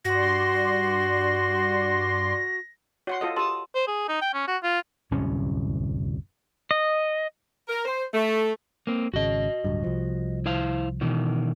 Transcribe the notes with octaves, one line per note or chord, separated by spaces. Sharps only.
G2 F#4 D5 C6 A#6
F#4 C#5 F#5 C6
F4 A4 D#5
G4 A#4 A5 C6 D#6
C5
G#4
D#4
G5
C#4
F#4
F4
D1 C2 F#2 C#4
D#5
A#4
C5
A3
A#3 C4
G#1 C#3 F#4 D#5
D1 G2
C2 F3
E4 C5 F5
B2 D#3 E3